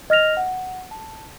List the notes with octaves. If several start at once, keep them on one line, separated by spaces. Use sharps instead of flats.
D#5 F6 A#6 F7
F#5
A5